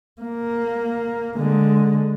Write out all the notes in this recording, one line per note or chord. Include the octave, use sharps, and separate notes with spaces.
A#3
D3 G#3